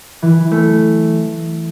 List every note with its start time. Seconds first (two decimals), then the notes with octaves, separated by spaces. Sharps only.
0.22 E3
0.51 A3